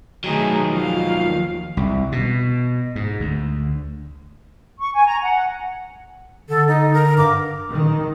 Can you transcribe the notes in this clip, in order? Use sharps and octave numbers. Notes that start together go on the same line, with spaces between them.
D#3 F#3 A3 D#4 G#4
D#2 F3 F5
C2
B2
G#2
D2
C#6
G#5
A#5
F#5
D3 A4
D#4
A#4
G2 D6
D#3